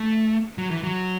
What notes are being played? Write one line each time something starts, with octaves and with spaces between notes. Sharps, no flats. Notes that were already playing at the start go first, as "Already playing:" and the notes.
Already playing: A3
F#3
E3
F#3